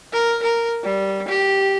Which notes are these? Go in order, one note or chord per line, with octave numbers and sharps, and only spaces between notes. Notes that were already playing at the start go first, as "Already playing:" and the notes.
A#4
A#4
G3
G4